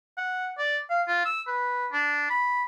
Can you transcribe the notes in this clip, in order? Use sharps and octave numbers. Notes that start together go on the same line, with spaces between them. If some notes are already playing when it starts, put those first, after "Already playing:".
F#5
D5
F5
F4
E6
B4
D4
B5